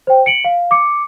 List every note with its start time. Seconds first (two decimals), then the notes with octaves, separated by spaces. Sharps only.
0.07 C5 G5
0.26 C#7 D7 F#7
0.45 F5
0.71 D6 C#7